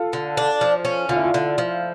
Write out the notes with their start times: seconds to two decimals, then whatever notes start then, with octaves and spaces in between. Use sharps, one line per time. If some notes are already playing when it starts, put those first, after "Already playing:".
Already playing: F4 A4
0.13 D3
0.37 D4
0.61 F3
0.85 C#4
1.09 D3 F4
1.16 E4
1.24 F4
1.34 D3
1.58 F3